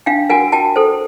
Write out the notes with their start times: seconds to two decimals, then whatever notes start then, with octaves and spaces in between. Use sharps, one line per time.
0.06 D4 F5 G5
0.30 F#4 A#4 F#5 G#5
0.52 F#4 G5 A5
0.76 A4 C5